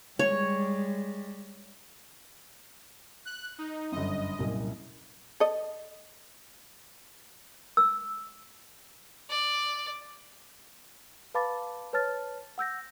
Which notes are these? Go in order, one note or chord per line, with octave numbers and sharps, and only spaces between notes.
G3 G#3 C#5
F#6
D#4
G1 F#2 D#5
C2 F#2 A#2
A4 D#5
E6
D5
B4 F5 A5 B5 D6 A6
B4 C#5 A5 F6 A6
F#5 E6 G6 A#6